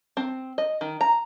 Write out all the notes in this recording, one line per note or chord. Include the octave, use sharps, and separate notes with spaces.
C4
D#5
D#3
A#5